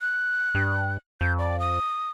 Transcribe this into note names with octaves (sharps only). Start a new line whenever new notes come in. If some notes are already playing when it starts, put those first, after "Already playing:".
F#6
G2
F2 G6
D5
D#6